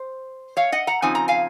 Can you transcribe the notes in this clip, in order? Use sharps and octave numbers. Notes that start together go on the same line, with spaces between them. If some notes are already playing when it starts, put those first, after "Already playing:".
Already playing: C5
C#5 F5
D#5 F#5
F#5 A#5
C#3 F3 C4 D#4 G#5
A#5
F5 G#5